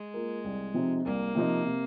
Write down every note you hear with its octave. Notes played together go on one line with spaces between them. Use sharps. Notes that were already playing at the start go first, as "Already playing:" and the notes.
Already playing: G#3
A#3 F4 A#4
C2
C3 F3 C4 D#4
C2 A#3
C3 F3 C4 D#4
C3